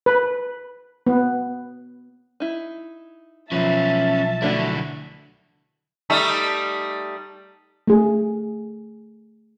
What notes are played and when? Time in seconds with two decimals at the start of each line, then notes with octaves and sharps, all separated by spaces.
0.06 B4
1.07 B3
2.40 D#4 E4
3.52 B1 F3 C#4 B4 E5 A5
4.42 D3 A3 D4 E4 F#4
6.10 G3 A3 D#4
7.88 A3 G#4